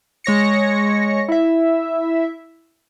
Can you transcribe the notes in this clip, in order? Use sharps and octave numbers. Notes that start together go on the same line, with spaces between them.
G#3 C#5 A#6 C#7
E4 E5